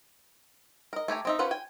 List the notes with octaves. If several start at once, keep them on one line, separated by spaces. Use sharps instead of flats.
A#4 D#5
A3 G4 G#5 A#5
C4 D#4 E5
C#4 F4 B4 C5 F#5
G5 G#5